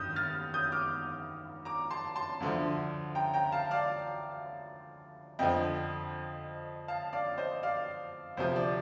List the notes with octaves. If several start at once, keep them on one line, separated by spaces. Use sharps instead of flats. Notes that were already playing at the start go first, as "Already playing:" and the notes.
Already playing: G2 D#3 D#6 G6
F6 A6
D#6 G6
D6 F6
A#5 D6
A5 C6
A5 C6
D2 D3 F3
G5 A#5
G5 A#5
F5 A5
D5 F5
F2 D3 F3 D#5 G5
F5 A5
D5 F5
C5 D#5
D5 F5
D2 C3 F3 C5
D5